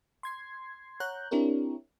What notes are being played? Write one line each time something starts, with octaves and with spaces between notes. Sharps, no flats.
C6 G#6 C7
C#5 F#5 A#5 F#6 G6
C4 D4 E4 G4 A#4 C#5